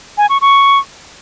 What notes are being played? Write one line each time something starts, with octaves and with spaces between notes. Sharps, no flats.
G#5
C#6
C#6